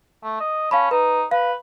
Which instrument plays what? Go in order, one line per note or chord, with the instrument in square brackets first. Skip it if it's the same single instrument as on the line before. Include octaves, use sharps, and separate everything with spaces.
[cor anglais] A3
D#5
[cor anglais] C#4 [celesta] F5 A5 B5
[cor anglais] D#4 [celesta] B4
[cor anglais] B4 [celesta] F5